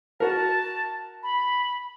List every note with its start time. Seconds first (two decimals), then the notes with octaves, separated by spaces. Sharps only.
0.20 F#4 A#4 A5
1.23 B5